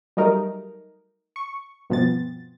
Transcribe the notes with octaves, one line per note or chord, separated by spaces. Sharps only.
F#3 G3 A3 D#4 A#4
C#6
G2 B2 F3 B3 C4 A6